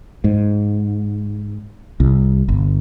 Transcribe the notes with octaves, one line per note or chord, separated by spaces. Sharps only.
G#2
C2
G1